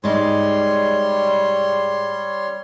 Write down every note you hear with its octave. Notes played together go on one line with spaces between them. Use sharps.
G#2 G3 G#3 C#5 C6